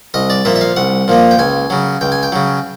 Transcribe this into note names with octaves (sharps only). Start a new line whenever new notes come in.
C2 D#5
D5
A#2 F3 A#3 E5
E5
F5
C2 F#5
A#2 F3 A#3
G5
C#2 G#5
C#3 F#3
C#2 G5
G#5
G5
C#3 F#3